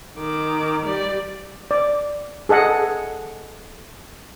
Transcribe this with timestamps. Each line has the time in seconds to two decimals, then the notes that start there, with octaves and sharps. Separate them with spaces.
0.17 D#3 D6
0.86 G3 D5
1.71 D5
2.49 G#4 A4 D#5 F#5